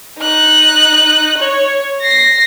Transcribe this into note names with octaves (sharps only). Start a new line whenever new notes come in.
D#4 F#6
C#5
A#6 C7